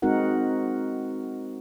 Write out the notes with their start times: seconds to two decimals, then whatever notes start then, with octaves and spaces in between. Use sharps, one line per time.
0.02 G#3 C4 D#4 F#4 A#4 F#5